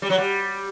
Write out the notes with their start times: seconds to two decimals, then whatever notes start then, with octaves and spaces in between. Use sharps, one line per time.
0.02 G3
0.10 F#3
0.18 G3